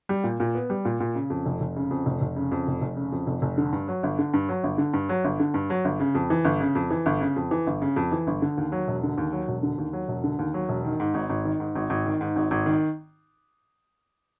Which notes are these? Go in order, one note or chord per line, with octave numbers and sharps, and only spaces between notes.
G3
A#2
A#2
B3
G3
A#2
A#2
C#3
F2
F1
F1
C#3
F2
F1
F1
C#3
F2
F1
F1
C#3
F2
F1
F1
D3
G2
F#3
G1
D3
G2
F#3
G1
D3
G2
F#3
G1
D3
G2
F#3
G1
C#3
F2
E3
G1
C#3
F2
E3
G1
C#3
F2
E3
G1
C#3
F2
E3
G1
D3
D#2
F#3
E1
D3
D#2
F#3
E1
D3
D#2
F#3
E1
D3
D#2
F#3
E1
D#3
G#2
G#1
G#1
D#3
G#2
G#1
G#1
D#3
G#2
G#1
G#1
D#3